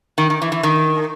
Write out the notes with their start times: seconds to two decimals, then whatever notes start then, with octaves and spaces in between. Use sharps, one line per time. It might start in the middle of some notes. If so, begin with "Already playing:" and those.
0.18 D#3
0.30 D#3
0.42 E3
0.52 E3
0.63 D#3